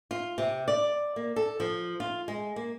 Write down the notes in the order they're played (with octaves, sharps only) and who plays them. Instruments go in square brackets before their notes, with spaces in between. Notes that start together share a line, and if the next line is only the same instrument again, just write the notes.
[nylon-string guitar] F4
C3
D5
A#3
A4
F3
F4
G#3
A#3